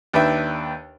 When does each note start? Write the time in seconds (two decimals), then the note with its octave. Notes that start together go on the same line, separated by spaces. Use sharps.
0.13 D#2 D4 B4 E5 G5